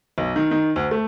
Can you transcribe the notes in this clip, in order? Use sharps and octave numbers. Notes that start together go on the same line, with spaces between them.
B1
D#3
D#3
D2
A3